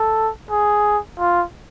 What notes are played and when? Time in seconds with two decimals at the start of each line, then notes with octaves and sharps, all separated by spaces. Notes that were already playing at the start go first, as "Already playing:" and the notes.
Already playing: A4
0.51 G#4
1.19 F4